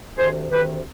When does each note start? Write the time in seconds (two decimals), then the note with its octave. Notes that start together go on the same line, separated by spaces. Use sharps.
0.18 D2 C3 D#3 G#4 C5
0.50 D2 C3 D#3 G4 B4